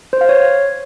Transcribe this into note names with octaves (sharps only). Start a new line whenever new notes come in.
C5
F5
C#5